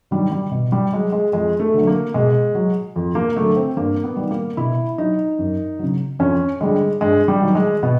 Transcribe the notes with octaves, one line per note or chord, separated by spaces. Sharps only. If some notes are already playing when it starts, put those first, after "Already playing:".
D#3 F#3 G3
G3
B2
G3
F#3 G#3
G#3
F2 G#3
A3
D3 F#3
A#3
B2 G#3
F#3
F2
A#3
D3 F#3 A3
C4
G2 A#3
B3
D#3 G3
A#3
B2 E4
F#3 D#4
F#2
C#3 F#3
F2 C#4
D3 G3 G#3
G2 G#3
G3
D#3 F#3
G#3
B2 B3